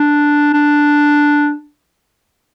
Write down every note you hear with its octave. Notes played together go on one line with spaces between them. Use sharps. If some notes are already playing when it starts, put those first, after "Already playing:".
Already playing: D4
D4